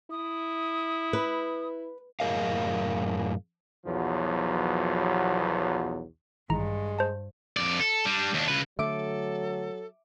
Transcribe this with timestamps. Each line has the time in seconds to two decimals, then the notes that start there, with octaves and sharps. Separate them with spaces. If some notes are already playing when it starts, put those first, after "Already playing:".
0.11 E4 D#6
1.13 B4
2.20 F#2 A2 G#4 A#4 D#5 F5
3.86 B1 E2 F3 F#3
6.50 A1 G2 D#3 E3 G#3 A#5
6.99 C5 A5
7.57 F2 D5
7.80 A4
8.05 G3 D4
8.34 D#2 D4
8.48 C#3 B4
8.79 D3 F#3 A3 A4 E5 D6 D7